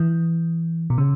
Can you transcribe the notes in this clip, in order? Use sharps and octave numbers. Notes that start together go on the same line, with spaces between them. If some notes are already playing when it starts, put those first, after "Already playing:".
Already playing: E3
B2
C#3